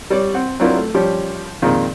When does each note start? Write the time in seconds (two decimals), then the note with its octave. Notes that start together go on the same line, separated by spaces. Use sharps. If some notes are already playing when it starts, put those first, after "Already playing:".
0.10 G3 C#5 D5
0.34 C4 F#5
0.60 F#3 C4 D4 E4 F4 A#4
0.77 A3
0.94 F3 G3 C#4 G4 C#5
1.62 F2 A#2 D#3 G#3 C4 F4